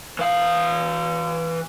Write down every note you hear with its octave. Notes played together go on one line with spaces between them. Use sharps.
E3 F5